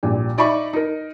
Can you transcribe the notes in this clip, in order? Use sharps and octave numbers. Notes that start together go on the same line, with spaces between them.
A#1 A#2 G3
D#4 D5 E5 B5 C#6
D#4 A#4